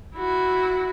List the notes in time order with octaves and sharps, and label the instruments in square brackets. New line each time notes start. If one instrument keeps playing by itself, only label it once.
[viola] E4 F#4